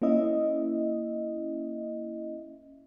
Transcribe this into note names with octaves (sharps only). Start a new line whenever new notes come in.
A#3 C#4 E4 D#5 E5